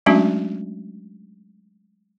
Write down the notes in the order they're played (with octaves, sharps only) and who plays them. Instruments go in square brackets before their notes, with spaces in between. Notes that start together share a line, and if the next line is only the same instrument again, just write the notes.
[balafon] F#3 G#3 A3 C#4 D4 F#4